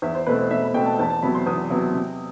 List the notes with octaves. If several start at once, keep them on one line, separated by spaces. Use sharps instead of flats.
E2 E5
C5
B2 A3 C4 B4
C5
E2 E5
B5
B2 A3 C4 G5
A5
E2 A5
A5
C3 F#3 B3 B5
C6
E2 D#6
C3 F#3 B3
C3